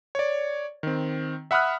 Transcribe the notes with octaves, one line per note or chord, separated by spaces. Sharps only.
C#5 D5
D#3 C4
E5 F#5 B5 D#6 F6 F#6